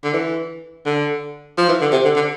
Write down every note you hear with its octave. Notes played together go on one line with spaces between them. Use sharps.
D3
E3
D3
F3
E3
D3
C3
D3
D3